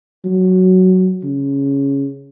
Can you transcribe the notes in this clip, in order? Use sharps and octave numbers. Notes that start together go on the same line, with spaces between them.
F#3
C#3